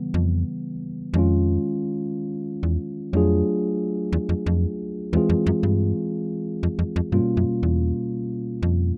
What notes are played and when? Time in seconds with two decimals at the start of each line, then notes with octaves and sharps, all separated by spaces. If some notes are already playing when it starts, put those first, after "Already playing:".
Already playing: C#3 E3 G3 B3
0.14 F2
1.14 F2 D#3 G#3 C#4 F4
2.63 E2
3.13 F2 F#3 A3 D4 F4 G#4
4.13 E2
4.29 F2
4.46 F2
5.13 E2 E3 G#3 C4 F4 G#4
5.29 F2
5.46 F#2
5.63 G2
6.63 F2
6.79 F2
6.96 F2
7.12 G2 B2 G3 A#3 C#4 F4
7.37 F#2
7.63 E2
8.63 F2